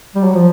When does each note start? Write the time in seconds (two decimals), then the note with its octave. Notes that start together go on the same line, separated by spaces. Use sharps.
0.15 G3
0.24 F#3
0.35 F3